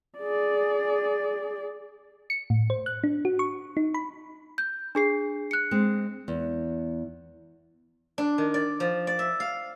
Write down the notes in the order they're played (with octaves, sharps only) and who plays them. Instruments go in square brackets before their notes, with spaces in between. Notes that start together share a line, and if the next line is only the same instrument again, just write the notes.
[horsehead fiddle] G#4 D5
[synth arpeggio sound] C#7
A2
C5
F#6
D4
F#4
C#6
D#4
B5
[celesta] G6
D4 G#4 C7
F#6 C#7
[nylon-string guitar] G#3 C4
E2
[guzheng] D4
D#3
D5
F3
D5
E5
F5